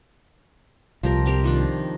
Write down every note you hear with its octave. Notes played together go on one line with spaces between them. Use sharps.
C2 F3 G4 A#4
C4 G4 A#4
D#3 F3 D4